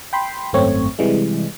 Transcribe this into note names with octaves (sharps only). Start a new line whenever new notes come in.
G5 B5 C6
G#1 F#2 A3 C4 C#5
C3 E3 G3 G#3